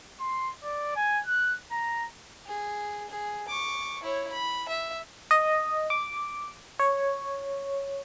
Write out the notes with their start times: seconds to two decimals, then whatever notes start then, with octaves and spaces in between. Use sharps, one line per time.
0.20 C6
0.64 D5
0.96 G#5
1.26 F#6
1.71 A#5
2.46 G#4
3.09 G#4
3.48 C#6 D6
4.03 E4 C#5
4.32 B5
4.69 E5
5.31 D#5
5.90 D6
6.79 C#5